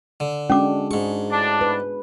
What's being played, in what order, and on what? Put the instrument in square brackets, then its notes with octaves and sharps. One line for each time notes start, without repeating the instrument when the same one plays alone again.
[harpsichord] D3
[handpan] G#3 D4 F#4 [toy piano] C#4 D6
[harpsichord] G#2 C#6 [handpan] G#4
[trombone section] A2 D4
[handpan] B4